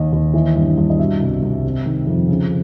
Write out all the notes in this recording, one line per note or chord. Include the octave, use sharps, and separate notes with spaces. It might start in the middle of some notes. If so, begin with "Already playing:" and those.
Already playing: D#2 D#3 D#5
D#2
E3
G2
G2
D#5
B2 E5
C2
C2
C3
D#3
F2
C#3